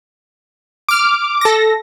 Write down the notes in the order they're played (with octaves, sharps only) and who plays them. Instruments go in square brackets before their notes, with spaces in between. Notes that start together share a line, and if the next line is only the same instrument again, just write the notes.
[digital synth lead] D6 [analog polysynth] F6 D7
[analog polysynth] A4 A#6